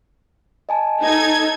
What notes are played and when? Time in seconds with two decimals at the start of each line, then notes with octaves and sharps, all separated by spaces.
0.69 D#5 G#5 A5
1.02 D#4 A4 G#6